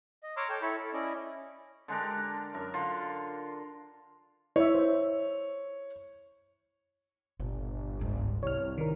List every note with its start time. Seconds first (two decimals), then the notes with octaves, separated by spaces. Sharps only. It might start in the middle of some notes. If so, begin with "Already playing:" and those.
0.23 D#5
0.37 C#5 A#5 C6 D6 E6 F6
0.49 A4 C#5 G5 E6 F6
0.62 E4 A4 C#5 B5
0.78 A4
0.93 C#4 E4 D5 D#5
1.88 D3 G#3 D4 A#4
2.01 G4
2.54 F#2 A#4
2.74 D3 F4
4.56 E4 C#5 E5
4.75 C5
7.40 G1 A#2
8.00 C#2 G#2
8.43 C2 A3 B3 C#5 F6
8.78 D#3 A#4